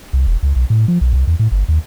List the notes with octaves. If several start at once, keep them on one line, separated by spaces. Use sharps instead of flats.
C2
E1
C#2
B1
A2
F3
B1
C2
E2
A2
G1
D#2